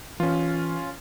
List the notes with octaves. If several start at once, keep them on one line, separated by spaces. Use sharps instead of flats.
E3 C#4 F4